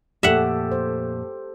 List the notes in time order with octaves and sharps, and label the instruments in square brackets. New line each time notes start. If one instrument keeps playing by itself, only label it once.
[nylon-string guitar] F2 A#2 A3 [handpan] G4 A4 [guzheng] E5 F#5
[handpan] C5